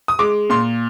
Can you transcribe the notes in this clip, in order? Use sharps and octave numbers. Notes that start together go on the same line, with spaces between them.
D#6
G#3 D6
A#2 C6